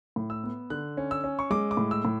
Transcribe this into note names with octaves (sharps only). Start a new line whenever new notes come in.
A2
E6
B3
D3 F#6
C#4
E6
C#4
C#6
G#3 D6
D6
A2
E6
A2